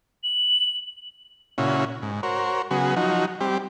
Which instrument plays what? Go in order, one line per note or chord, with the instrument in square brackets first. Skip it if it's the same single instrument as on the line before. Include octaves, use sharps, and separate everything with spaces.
[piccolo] F#7
[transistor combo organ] A#2 C#3 C#4 E4 F#4
G#2
F#4 A#4 C5 C#5
C#3 F#3 B3 F#4 G#4
F3 F#3 D#4 F#4
G3 C4 G4